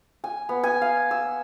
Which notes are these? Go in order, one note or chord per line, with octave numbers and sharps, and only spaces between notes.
G#5
B3
G#5
F5
E6